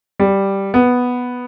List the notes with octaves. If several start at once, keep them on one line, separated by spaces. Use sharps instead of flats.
G3
B3